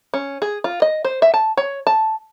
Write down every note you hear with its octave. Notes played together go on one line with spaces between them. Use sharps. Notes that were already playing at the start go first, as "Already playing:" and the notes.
C#4
G#4
F4
D#5
C5
E5
A5
C#5
A5